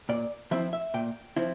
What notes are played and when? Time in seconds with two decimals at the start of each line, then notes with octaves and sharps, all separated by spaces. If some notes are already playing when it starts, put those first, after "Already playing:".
0.09 A#2 D5
0.51 F3 C4 E4 E5
0.73 E5
0.94 A#2 G5
1.37 F3 C4 E4